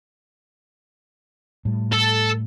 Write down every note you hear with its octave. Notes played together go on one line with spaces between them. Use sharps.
A2 G3
A4